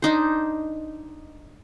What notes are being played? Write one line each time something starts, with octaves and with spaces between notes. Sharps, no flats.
D4 D#4 C5